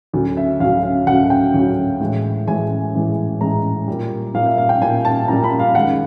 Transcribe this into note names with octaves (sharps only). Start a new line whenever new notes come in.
D2 C#3 F#3
E5
D2 C#3 F#3 F5
F5
D2 C#3 F#3 F#5
G5
D2 C#3 F#3
A2 E3 G#3
A2 E3 G#3 G#5
A2 E3 G#3
A2 E3 G#3 A#5
A#2 G3
A#2 G3 F5
E5
F5
G5
A#2 G3 G#5
A5
A#2 G3 A#5
B5
F5
F#2 D#3 G#3 F#5